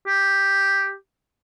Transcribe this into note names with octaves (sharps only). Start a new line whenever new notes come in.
G4